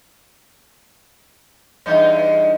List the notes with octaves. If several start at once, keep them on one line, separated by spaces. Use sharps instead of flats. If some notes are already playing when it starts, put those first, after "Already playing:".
E2 G2 D#4